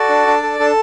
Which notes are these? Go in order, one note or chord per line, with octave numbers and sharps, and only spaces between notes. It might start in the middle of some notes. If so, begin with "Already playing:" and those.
Already playing: F#4 A4 D5
D4
D4
A4
D4 A4